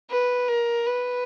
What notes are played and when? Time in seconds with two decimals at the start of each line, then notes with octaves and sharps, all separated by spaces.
0.10 B4
0.48 A#4
0.86 B4